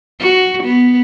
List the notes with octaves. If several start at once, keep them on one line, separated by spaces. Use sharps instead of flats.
F#4
B3